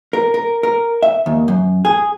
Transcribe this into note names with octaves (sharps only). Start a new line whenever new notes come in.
A#4
A#4
A#4
E5
D#2
F#2
G#4